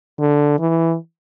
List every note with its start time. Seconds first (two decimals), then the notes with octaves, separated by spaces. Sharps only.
0.19 D3
0.59 E3